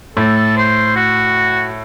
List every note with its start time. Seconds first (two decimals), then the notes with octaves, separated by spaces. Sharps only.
0.17 A2 A4
0.57 C5
0.96 F#4